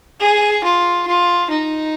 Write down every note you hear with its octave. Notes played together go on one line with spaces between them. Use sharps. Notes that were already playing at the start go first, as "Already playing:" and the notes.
G#4
F4
F4
D#4